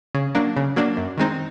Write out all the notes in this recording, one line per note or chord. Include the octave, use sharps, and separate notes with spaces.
C#3
F#3 A#3 D4
C#3
F#3 A#3 D4
F#2
D#3 G#3 C4 D#4